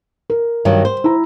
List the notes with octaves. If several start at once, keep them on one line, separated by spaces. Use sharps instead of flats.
A#4
G2 D#3 F#3
C5
E4 A#5